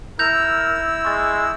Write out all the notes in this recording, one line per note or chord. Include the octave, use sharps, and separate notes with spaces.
E4 A#4 E6 G6 A#6 F7
G#3 C#6 A6